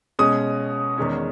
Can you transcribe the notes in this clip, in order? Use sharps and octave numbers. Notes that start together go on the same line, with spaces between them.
B2 G#3 C#4 D#6
E2 D#3 G#3 C#4